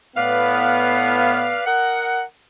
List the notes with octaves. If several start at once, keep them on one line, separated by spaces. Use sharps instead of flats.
A2 B3 B4 D5 F5
A#4 D#5 F#5